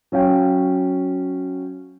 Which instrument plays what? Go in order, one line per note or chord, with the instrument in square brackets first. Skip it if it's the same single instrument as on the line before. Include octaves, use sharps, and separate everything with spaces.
[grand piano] F#3 C#4 F5 G5